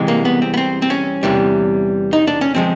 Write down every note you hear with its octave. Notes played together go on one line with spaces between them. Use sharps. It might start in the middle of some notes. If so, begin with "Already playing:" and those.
Already playing: C2 C3 E3 G#3
A#3
B3
C4
B3
C4
C4
C#4
E2 C3 E3 G3
D#4
D4
C#4
F3 G#3 C4